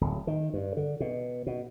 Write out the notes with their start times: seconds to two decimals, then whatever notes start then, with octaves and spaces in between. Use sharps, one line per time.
0.01 D1
0.27 D#3
0.54 G2
0.77 D3
1.00 B2
1.47 B2